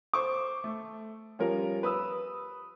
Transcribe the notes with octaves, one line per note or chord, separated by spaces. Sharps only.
C5 C#6 D6
A3
F3 G3 C#4 F4 A#4
B4 D#6 E6